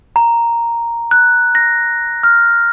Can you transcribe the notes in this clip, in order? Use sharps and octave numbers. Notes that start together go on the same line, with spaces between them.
A#5
F#6
A#6
F6